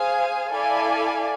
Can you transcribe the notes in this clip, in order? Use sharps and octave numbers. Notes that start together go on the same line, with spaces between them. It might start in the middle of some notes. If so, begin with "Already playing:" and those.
Already playing: G#4 C5 F5 G#5
E4 A4 D5 F5 G#5